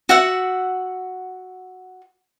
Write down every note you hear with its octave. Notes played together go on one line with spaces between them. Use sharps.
F#4 E5 F#5